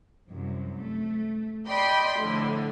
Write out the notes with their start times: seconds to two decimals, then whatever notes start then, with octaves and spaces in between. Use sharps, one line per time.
0.29 C2 F#2
0.79 A3
1.68 D5 D#5 G5 B5 C6
2.20 A2 D3 F3